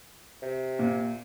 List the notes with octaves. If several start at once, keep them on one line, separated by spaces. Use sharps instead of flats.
C3
A#2